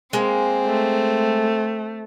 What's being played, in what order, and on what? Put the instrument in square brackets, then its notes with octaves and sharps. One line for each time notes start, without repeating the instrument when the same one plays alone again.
[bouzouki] G#3 A#3 [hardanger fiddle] C4
[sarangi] A3